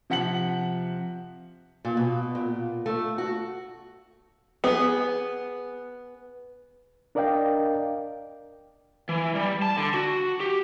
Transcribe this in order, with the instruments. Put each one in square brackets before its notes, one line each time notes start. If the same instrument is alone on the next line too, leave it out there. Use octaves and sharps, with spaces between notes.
[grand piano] C3 F3 F#5 B6 C#7 F#7
[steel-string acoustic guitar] A#2
B2
A#2
A3
F#4
[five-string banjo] B3 G#4
[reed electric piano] D4 A#4 D5 D#5 F5 G5
[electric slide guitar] E3
G3
A5
D3
F#4
G4